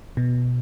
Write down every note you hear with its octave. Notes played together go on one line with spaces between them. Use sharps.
B2